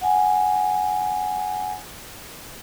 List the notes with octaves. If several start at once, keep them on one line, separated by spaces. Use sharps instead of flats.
F#5 G#5